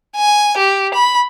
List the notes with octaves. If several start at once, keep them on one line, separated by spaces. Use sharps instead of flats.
G#5
G4
B5